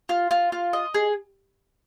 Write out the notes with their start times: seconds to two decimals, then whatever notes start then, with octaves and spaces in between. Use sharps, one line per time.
0.09 F4
0.31 F4
0.52 F4
0.73 D#5
0.94 G#4